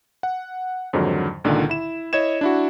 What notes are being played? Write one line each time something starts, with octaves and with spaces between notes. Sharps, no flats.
F#5
F2 G#2 D3 D#3 F#3
C#2 A#2 D3 D#3
E4 E7
E4 C#5 D#5 G#6 E7
D4 E4 F#4